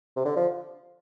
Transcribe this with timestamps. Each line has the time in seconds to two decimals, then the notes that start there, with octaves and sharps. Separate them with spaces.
0.16 C3
0.25 D3
0.36 F3